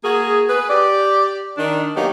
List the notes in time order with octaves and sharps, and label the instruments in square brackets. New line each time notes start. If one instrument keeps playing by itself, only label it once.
[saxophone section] A#3 F#4 G#4
G#4 B4
G4 D5
D#3 D4
F#3 A#3 B3 D#4 G4